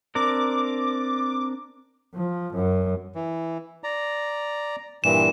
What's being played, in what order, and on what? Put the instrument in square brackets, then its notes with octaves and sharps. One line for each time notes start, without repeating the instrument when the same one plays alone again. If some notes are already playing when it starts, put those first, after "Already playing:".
[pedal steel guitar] C4 D4 A#4 [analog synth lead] D6
[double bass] F3
F#2
[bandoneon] E3
D5 A#5
[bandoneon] G2 A#2 E3 [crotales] E7